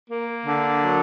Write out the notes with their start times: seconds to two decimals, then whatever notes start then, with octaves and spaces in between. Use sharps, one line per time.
0.11 A#3
0.45 D3
0.80 F#3